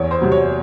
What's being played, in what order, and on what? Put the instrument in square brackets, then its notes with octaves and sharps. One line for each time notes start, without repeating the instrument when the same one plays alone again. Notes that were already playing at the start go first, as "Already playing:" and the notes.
Already playing: [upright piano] E2 C#5
C5
C3 F#3
C#5